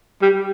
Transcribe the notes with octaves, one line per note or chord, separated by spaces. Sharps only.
G3